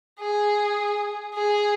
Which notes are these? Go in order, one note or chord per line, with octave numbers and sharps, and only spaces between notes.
G#4
G#4